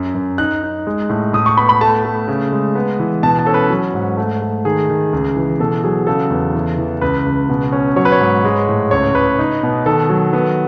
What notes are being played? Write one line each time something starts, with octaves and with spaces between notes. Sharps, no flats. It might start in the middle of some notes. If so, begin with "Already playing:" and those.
Already playing: F#2
F#2
D#4 F#6
D#4
G#3
A2
A2 D#6
C#6
B3 B5
B5
A3 A5
A3
C#3
G#3
B3
E3
B2 A5
A5
C#4 A4
B4
F#3
G#2
A3
A3
D#3 G#4
D#3
C#2
E3
B2 A4
F#3 G#4
C#3 A4
E2
E3
E3
C#2 B4
C#2
B2
C#4
F#3 C#5
B4
C#5
G#2
G#3
A2
C#2 C#5
C#2 B4
D#4
B2
D#3 A4
F#3
B3